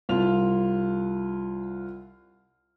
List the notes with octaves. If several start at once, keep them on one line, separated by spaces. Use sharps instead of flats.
C2 F4 F7